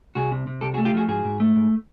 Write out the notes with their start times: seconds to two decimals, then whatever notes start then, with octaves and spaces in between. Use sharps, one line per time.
0.15 C2 F#4 G#4
0.31 C3
0.47 C3
0.61 C2 G4 A4
0.74 F#4 G#4
0.78 A3
0.85 F4 G4
0.94 F3 F#4 G#4
1.08 G#2 F#4 G#4
1.25 G#2
1.40 A3
1.56 G#2